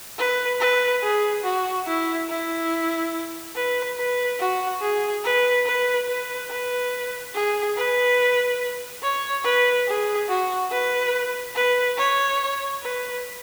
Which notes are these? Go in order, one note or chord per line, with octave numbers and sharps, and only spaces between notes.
B4
B4
G#4
F#4
E4
E4
B4
B4
F#4
G#4
B4
B4
B4
B4
G#4
B4
C#5
B4
G#4
F#4
B4
B4
C#5
B4